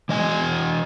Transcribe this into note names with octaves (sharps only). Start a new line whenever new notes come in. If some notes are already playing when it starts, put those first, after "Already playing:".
E3 D#5 G#5